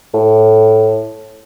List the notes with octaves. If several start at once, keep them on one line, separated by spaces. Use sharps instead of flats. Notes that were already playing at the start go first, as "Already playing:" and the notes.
A2